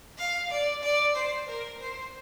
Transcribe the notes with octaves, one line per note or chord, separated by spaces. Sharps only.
F5
D5
D5
C5
A#4
C5